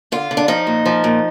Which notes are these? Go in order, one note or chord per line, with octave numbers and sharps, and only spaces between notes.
D3 F4
D3
D4
F3 D#4
A#2
F3
A#2